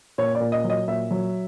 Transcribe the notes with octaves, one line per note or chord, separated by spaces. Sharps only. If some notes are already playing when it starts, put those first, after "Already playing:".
A#2 C#5
D5
A#2
D#5
F#3
D#5
A#2 E5
F#3